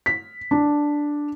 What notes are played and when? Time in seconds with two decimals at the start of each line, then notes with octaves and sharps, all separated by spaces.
0.06 B6
0.51 D4